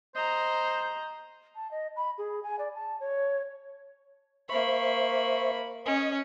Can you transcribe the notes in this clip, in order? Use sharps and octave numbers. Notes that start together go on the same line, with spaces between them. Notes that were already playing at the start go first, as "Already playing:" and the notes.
C5 D#5 A#5
A5
D#5
B5
G#4
G#5
D5
A5
C#5
A#3 C5 E5 B5 C#6
C#4 D#5 D#6